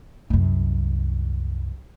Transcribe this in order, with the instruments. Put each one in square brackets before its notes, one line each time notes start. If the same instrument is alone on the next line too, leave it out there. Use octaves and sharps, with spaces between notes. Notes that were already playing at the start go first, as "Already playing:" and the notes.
[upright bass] C2 F#2